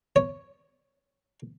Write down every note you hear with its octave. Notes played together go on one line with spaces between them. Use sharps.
C#5